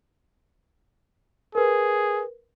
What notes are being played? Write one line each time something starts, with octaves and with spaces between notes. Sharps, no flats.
G#4 A#4 B4